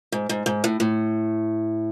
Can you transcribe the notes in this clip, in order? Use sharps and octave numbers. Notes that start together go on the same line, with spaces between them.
G#2
G#2
G#2
A2
A2